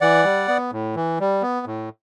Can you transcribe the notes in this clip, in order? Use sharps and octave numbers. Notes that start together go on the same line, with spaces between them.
E3 D5 F#5
G3
B3
A2
E3
G3
B3
A2